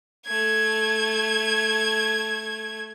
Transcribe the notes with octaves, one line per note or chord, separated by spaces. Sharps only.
A3 G#6